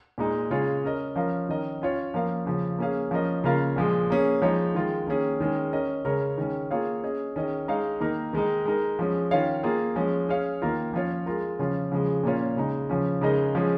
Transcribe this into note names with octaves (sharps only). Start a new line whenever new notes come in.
A#2 G#3 D#4
C#3 G#3 F4 G#4 C#5
C#4 A#4 D#5
F3 C#4 A#4 F5
D#3 C#4 A#4 D#5
C#4 F4 C#5
F3 A#3 C#4 A#4 F5
C#3 F3 C#4
A#3 C#4 G#4 F5
F3 C#4 A#4 D#5
C#3 A#3 F4 A#4 F5
A#2 F3 G#3
A#3 C#4 G#4
F3 G#3 D#4 C#5
D#3 G#3 F4
D#3 A#3 C#4 G#4
D#3 G#3 C#4 G#4
C#4 A#4 D#5
C#3 G#3 C#4 A#4 C#5
D#3 G#3 C#4
A#3 F4 G#4 C#5 F5
C#4 G#4 D#5
D#3 C#4 G#4 D#5
G#3 D#4 C#5 F5
D#3 A#3 D#4 A#4
D#3 G#3 D#4
G#3 D#4 A#4
F3 G#3 C#4
D#3 C#4 F4 C#5 F5
A#3 F4 G#4
F3 G#3 C#4
C#4 G#4 C#5 F5
D#3 A#3 F4 A#4
F3 C#4 F4 C#5
G#3 F4 A#4
C#3 F3 C#4 F4
C#3 F3 G#3
A#2 A#3 C#4 F4 C#5
C#3 G#3 D#4
C#3 F3 C#4
C#3 G#3 D#4 A#4 D#5
F3 G#3 C#4 G#4